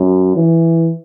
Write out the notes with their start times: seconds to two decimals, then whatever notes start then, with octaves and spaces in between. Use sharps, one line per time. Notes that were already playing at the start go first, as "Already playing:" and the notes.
Already playing: F#2
0.36 E3